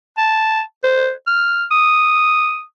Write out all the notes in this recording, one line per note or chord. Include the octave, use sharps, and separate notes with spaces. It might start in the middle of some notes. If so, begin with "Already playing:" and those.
A5
C5
F6
D#6